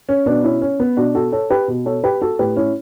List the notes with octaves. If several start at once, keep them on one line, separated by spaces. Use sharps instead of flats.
C#4
B2 B3 D4
C#4 E4
C#4
B3
B2 D4 F#4
F#4 A4
A4 C#5
G4 B4
B2
A4 C#5
G4 B4
F#4 A4
A2 G4 B4
C#4 E4